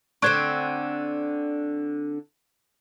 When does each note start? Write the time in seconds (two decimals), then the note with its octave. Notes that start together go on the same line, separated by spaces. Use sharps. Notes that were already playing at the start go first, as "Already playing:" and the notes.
0.22 D3 C4 D4 C#6 F#6 G#6